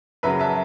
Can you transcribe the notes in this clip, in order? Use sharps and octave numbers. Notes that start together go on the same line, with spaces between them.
F#2 C#3 F#3 B4 E5
E5 A5